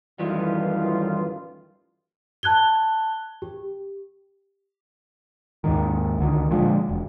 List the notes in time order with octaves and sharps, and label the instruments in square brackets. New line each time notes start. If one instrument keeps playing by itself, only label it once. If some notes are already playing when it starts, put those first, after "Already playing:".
[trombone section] A1 F#2 F4 [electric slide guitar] D#3 E3 G3
[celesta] A5 F#6 G#6 G7
G4
[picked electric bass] D#2 G#2 D#3
C#2 D3 D#3
A#2 D3 F3 G#3
E1